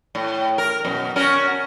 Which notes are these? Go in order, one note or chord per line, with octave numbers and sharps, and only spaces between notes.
A2
A#4
F#2 B2
C#4 F#4 A#4